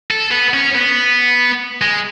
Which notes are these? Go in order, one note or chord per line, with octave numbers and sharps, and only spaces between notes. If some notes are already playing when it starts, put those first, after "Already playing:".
A4
B3
C#4
B3
G#3